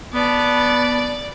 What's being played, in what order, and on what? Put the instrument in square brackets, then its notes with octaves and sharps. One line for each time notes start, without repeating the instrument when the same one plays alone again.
[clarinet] B3 [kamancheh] B4 A5 [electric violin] D5